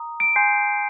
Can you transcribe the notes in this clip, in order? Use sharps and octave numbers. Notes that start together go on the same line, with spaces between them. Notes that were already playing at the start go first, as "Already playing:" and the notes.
Already playing: A#5 D#6
D7
G#5 C6 G6 C7